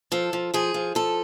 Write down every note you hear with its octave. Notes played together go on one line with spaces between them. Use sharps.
F3 A4
F3
F3 G#4
F3
F3 A4